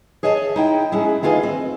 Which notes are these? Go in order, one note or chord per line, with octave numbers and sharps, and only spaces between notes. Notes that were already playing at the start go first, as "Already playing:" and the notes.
G#4 C#5 D#5 E5 G#5 A5
D#4 E4 G5
G#3 C#4 E4 G#4
D#3 A3 F4 G#4 B4 D#5
C4